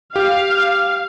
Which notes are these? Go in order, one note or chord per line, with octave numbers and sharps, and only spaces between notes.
G4 F5